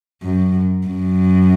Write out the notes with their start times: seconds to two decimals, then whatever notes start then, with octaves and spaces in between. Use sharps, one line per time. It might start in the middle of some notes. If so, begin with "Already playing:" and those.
0.23 F#2
0.87 F#2